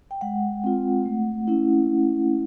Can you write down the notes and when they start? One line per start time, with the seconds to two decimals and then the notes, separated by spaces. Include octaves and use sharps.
0.11 G5
0.21 G#3 F#5
0.64 C4 F4
1.05 A3
1.47 C#4 E4